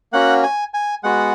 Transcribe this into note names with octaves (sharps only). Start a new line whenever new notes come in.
A#3 C#4 F#4 F#5
G#5
G#5
G#3 B3 F#4 F#5